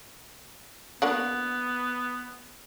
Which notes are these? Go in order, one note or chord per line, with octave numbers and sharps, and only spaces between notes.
A#3 B3 D4 F#4